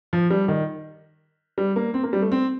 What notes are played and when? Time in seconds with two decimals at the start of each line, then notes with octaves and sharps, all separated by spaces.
0.13 F3
0.30 G3
0.48 D#3
1.58 G3
1.76 A#3
1.94 C4
2.03 A#3
2.13 G3
2.22 A3
2.32 C4